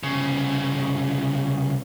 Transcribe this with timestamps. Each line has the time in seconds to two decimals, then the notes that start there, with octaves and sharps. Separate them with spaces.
0.03 C2 C#3